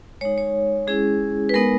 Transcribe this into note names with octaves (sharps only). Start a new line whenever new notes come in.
G#3 D#4 C#5
C#5
G#3 C#4 E4 G#4
B4
G#3 B3 D#4 A#4